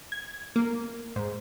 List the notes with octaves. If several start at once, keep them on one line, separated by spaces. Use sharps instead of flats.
G#6
A#3
G#2